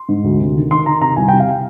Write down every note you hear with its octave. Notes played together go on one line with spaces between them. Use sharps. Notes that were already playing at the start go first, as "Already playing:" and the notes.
Already playing: C6
G#2
D2
C3
D#3
D#3 C6
D#3 A#5
C3 A#5
C2 G#5
G5
C3
F5